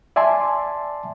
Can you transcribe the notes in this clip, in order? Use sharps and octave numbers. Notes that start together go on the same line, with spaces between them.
D5 E5 G#5 A5 C6